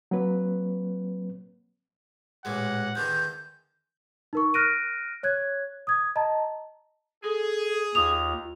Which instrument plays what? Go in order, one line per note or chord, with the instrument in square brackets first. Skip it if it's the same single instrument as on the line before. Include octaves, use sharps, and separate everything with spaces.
[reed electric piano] F#3 A#3 C4 B4
[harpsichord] A1 A#2 G#3 [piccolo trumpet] F#5
[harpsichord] E2 D3 D#3 [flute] G6
[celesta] D#4 A#4 C#6
F6 F#6 A#6 D7 D#7
C#5 F#6 G#6
D#6 G#6
D#5 A5 A#5
[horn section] G#4 [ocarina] A4
[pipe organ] D#2 [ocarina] F4 [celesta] D#6 F7